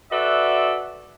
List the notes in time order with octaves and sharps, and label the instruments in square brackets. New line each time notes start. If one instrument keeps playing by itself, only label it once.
[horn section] F#4 A4 B4 D5 E5